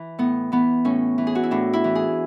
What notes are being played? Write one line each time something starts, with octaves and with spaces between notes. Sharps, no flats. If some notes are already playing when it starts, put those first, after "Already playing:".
Already playing: E3
A2 B3
E3 B3
A2 C#4
E3
G#4
F#4
E4
A2 D4
E4
E3
G#4